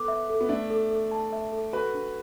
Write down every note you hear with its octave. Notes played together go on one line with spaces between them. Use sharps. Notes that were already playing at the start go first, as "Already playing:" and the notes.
Already playing: B3 A4 D6
E5
A4
B3
A3 D4 E5
A4
A4
A5
E5
A4
F#4 A4 B4
D4